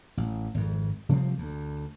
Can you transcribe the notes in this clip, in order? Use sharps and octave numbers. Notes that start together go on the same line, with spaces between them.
A1
G#1 F2
C3 F3 G3 C4
D2